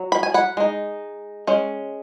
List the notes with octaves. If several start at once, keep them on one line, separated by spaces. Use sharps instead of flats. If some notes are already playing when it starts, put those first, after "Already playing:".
Already playing: F#3
B5
G#5
F#5 B5
G#3 D#4
G#3 C#4